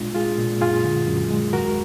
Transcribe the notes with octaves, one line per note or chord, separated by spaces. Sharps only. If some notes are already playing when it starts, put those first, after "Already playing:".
Already playing: A#2 G#3 D4 F4
G#3 F4 G#4
A#2
F#2 F4 G#4
D3
F#2
G#3
D#2 F#4 A#4